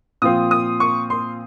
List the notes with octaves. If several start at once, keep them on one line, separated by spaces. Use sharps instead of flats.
A#2 F3 C4 F4 D#6
D#6
C#6
C6